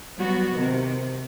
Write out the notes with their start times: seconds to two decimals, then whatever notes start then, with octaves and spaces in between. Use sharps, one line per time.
0.18 F#3 G3 B3 F#4
0.56 C3 D#3